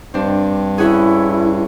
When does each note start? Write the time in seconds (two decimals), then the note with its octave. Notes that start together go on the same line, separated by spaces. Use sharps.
0.14 G2 C4 D4
0.78 C#4 E4 F#4 G#4